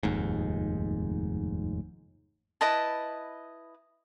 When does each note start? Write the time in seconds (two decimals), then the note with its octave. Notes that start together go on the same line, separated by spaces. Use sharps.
0.03 F1 D#2 G#2
2.61 E4 B4 D#5 A5